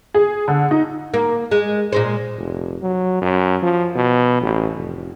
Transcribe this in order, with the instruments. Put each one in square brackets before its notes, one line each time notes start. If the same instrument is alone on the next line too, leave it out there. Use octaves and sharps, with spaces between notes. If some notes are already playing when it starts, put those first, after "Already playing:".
[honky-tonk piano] G#4
D3
D#4
[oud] A#3
G#3
A#2 G#3 C5
[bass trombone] F1
F#3
F#2
F3
B2
A1
F1